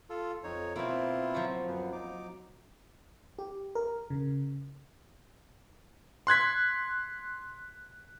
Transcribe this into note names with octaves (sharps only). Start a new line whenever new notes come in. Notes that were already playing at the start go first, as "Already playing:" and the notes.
F4 A4
F2 D#4 C#5
B2 A#3 C4 E4 F4
F3 F#3
F#2 B3
D#4 D6
G4
A#4
C#3
C6 F#6 G#6 B6